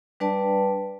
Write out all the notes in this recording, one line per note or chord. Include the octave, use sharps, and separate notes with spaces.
G3 D4 B4 D5 G5 A5